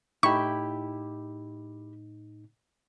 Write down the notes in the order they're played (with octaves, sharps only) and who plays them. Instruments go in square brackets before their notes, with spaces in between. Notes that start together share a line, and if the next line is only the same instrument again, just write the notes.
[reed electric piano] A2 D#4 [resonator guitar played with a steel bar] E4 G4 [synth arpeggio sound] C#6